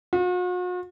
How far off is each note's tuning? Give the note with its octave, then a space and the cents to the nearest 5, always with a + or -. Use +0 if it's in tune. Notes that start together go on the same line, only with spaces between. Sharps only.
F#4 -45